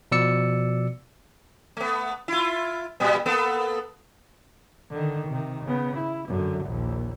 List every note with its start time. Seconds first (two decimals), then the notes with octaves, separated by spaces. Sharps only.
0.12 B2 F3 D5 E6 C#7
1.77 A3 B3
2.28 E4 F4
3.00 A#2 G3 B3
3.26 A#3 B3 A4
4.91 D3 D#3
5.29 C3 D#3
5.65 C#3 B3
5.97 E4
6.28 F#2 D3
6.65 A#1 D#2